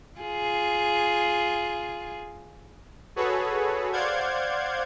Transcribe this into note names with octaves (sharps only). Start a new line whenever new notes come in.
F4 G#4
F#4 G#4 A4 B4 C#5
C5 D5 F5 F#5 G6 G#6